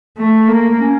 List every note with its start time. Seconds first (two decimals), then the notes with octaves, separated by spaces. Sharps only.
0.17 A3
0.48 A#3
0.80 C#4